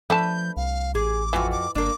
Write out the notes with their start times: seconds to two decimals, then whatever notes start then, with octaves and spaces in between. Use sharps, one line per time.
0.10 F3 A3 D4 B4 A5 G6
0.57 C2 F5
0.95 A1 G#4 D6
1.33 F2 E3 F4 F#4
1.52 D6
1.75 G1 A#3 D4 D6